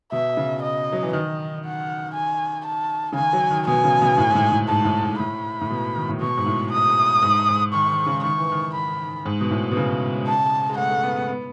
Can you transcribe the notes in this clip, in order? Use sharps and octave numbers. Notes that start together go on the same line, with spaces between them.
B2 E5
C#3
D#5
F#3
E3
D#3 D#5
F#5
G#5
A5
C#3
D#3 G#5
F#3
D#3
B2 G#5
C#3
B2
A2
G#2
A2
A2
G#2 A5
A2
G#2
A2 B5
A2
B2
D#3
A2
B2 C#6
G#2
A2
D#6
G#2
G#2
D#3 C#6
D#3
C#3
D#3 C#6
E3
D#3
B5
G#2
B2
A2
B2
C#3
A5
G#3
A3 F#5
A3
B3
B3
B3